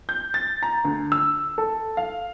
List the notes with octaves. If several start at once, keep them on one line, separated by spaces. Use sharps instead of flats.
G6
A6
A#5
D2
E6
A4
F5